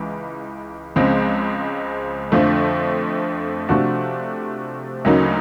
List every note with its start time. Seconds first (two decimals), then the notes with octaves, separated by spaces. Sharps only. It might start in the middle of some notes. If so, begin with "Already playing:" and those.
Already playing: C#2 E3
0.96 C#2 C#3 F3 G#3 C4
2.32 F2 D3 F3 A3
3.69 C3 F3 A3 D4 F#4
5.05 D2 C#3 F#3 A#3 D#4